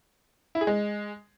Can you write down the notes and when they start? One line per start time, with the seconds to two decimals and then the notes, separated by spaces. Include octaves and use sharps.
0.55 E4
0.61 G#4
0.67 G#3